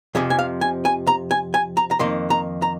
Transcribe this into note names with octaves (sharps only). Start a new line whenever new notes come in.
F2 C3 F3 G#4
G#5
F5
G#5
G#5
A#5
G#5
G#5
A#5
A#5
F2 D#3 A#3 C6
A#5
A#5